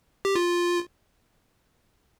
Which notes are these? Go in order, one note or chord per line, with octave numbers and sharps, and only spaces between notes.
G4
F4